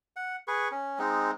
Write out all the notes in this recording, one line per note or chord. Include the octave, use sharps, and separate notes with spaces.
F#5
G#4 B4 C#6
C#4
G#3 C4 D#4